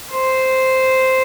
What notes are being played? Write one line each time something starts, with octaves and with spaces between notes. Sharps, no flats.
C5